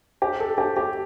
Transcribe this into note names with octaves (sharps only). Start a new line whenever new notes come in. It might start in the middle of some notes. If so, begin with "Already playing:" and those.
G4
A4
G4
G4